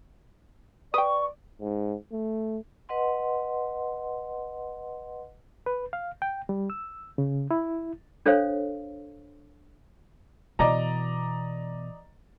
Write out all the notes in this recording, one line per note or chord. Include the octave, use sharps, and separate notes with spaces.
B4 D5 G5 C#6 D#6
G#2
A3
B4 D#5 F#5 C6
B4
F5
G5
G3
E6
C#3
E4
D4 A4 C5 C#5 F5
B2 E3 D5 D#5 A#5